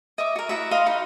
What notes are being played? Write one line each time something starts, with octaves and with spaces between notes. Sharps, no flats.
D#5 E5 D6
F#4 A#4
E4 F#4 E5
D#5 F5 B5 C6
D#4 F#4 B4